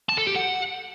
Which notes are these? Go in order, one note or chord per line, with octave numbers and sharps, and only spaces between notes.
A5
A4
G4
F#5